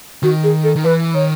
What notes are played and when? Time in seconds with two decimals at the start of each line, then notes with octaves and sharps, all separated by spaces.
0.23 D#3 F#4
0.44 G#4
0.64 A4
0.76 D#3
0.84 E3 B4
1.14 D#3 C#5